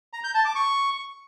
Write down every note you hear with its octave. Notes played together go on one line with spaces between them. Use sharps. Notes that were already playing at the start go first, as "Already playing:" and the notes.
A#5
G6
A5
D6
C#6